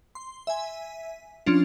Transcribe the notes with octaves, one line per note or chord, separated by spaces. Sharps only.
C6
E5 G#5
F3 C#4 D4 F4